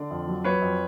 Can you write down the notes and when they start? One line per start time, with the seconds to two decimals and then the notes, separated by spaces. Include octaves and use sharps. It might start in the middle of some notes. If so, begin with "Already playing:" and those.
Already playing: D3 D5
0.10 F2
0.27 F#3
0.44 F#3 B4 C#5
0.62 F2